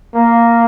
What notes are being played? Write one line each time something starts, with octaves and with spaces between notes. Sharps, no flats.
A#3